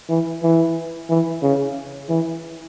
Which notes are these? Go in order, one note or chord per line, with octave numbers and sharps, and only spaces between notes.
E3
E3
E3
C#3
E3